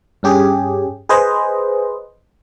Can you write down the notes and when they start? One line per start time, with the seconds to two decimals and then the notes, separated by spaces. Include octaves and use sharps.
0.23 G2 C#4 G4 G#4
1.09 G#4 B4 C5 D#5